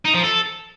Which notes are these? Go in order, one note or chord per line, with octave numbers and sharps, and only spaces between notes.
D#4
F3
A4